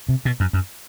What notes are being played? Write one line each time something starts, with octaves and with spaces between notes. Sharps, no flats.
C3
B2
F#2
F#2